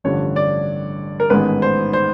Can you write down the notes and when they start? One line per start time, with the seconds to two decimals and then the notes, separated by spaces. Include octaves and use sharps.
0.04 A1 G2 D3 F3 C#5
0.36 D5
1.20 A#4
1.30 A1 G#2 D#3 G#3 B3 B4
1.62 C5
1.93 C5